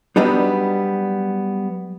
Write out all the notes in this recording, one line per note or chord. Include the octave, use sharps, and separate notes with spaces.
F#3 G3 B3 D4 D#4